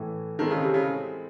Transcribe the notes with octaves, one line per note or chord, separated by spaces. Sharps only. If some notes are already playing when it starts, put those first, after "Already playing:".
Already playing: A2 E3 A3
D#3 G#3 C4 E4 A4
C#3
C3
C#3